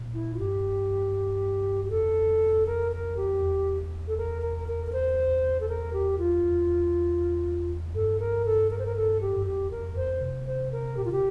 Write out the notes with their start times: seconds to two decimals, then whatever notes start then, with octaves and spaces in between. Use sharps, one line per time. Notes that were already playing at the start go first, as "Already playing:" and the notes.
Already playing: A#2
0.14 E4
0.34 F4
0.39 G2 G4
1.85 G4
1.90 F2 A4
2.67 A#4
2.92 A#4
3.17 G4
3.41 E2
4.08 A4
4.18 A#4
4.42 A#4
4.68 A#4
4.87 A#4
4.93 C5
5.61 A4
5.69 A#4
5.93 G4
6.18 F4
6.44 E2
7.95 G2 A4
8.20 A#4
8.46 A4
8.71 A#4
8.79 C5
8.86 A#4
8.96 A4
9.21 G4
9.36 G2
9.46 F2 G4
9.71 F2 A#4
9.96 F2 C5
10.21 C3
10.47 C5
10.72 A#4
10.97 A#2 G4
11.05 F4
11.09 C3 G4